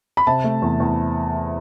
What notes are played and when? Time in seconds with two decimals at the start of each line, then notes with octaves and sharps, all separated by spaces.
0.17 B5
0.27 C3 A5
0.44 A3
0.62 E2
0.80 E2